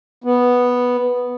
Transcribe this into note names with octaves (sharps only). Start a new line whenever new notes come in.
B3